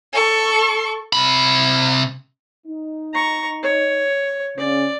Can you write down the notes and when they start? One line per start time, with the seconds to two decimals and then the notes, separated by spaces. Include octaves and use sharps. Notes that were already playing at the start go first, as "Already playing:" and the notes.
0.13 A4 C#6
1.13 C3 B5
2.67 D#4
3.13 A#5 C#6
3.63 C#5
4.58 C#3 C#4 D5